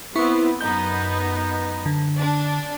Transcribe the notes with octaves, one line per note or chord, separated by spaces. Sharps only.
B3 C4 E4 C#6
F#2 B3 D#4 G6
D3
D4